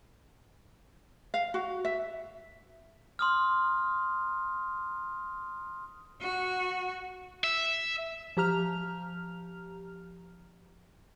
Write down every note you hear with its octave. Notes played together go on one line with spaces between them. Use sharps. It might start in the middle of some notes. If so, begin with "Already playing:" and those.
F5
F#4
E5
C6 D#6 F6
F#4
E5
F3 G4 A#5 F6 F7